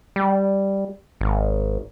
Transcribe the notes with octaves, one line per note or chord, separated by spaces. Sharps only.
G3
G#1